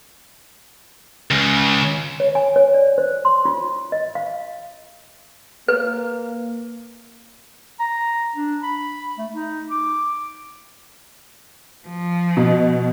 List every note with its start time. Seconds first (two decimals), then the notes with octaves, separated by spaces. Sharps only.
1.31 C#2 C#3
2.20 C#5
2.35 G#5
2.56 C#5
2.74 D5
2.98 C5
3.25 C6
3.45 F4
3.92 D#5
4.15 F5
5.68 A#3 B4
7.79 A#5
8.35 D4
8.63 B5
9.18 A3
9.33 D#4
9.70 D6
11.88 F3
12.37 B2